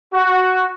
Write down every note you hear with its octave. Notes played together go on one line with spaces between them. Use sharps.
F#4